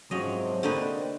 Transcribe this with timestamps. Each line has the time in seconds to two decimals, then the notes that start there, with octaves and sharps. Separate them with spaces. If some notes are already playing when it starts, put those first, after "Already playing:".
0.11 G#2 C3 F3 F#3 C4 C#4 F#4 D#5
0.63 D3 A#3 D#4 F#4 B4